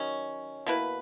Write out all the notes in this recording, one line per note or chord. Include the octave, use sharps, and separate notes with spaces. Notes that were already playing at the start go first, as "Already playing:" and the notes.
Already playing: D#3 F#3 C#4
B2 A#3 E4 B4